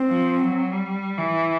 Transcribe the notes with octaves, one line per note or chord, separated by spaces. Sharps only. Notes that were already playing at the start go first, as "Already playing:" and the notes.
Already playing: C4
F3
F#3
G3
E3